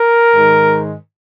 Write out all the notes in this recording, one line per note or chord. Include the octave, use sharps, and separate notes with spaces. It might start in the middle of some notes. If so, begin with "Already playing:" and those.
Already playing: A#4
G#2 D#3 G#3